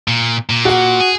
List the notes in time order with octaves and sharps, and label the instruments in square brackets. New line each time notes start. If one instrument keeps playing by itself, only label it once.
[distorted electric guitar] A#2
A#2
[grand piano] F#4 F#5
[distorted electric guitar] G#4